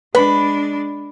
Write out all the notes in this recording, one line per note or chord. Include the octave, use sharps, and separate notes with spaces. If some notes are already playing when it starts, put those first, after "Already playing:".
G#3 D4 B4 B5